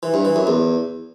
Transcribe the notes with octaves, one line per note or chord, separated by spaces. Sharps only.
E3
G2
E3
F#2
E2